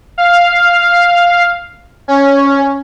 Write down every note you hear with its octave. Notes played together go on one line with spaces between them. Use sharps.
F5
C#4